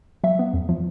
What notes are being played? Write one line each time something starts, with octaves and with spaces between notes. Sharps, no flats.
F#3 E5
B3
F2
F3